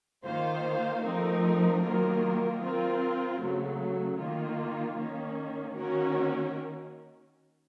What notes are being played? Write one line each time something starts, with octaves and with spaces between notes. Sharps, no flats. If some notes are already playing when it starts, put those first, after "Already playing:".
D#3 A#3 F4 C5 F5
F3 A3 C4 D#4 A#4
D#3 F#3 A#3 F4 A#4
C4 F4 A#4
C#3 F#3 A3
D#3 A#3 F4
D#3 A#3 C#4
D#3 A#3 C#4 F#4 A#4